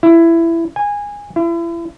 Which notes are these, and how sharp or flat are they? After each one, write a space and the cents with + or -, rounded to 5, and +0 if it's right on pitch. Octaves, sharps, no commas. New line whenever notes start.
E4 +15
G#5 -20
E4 +35